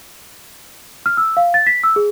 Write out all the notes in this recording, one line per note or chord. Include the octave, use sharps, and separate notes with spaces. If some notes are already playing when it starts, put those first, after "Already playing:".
F6
E6
F5
A6
B6
E6
G#4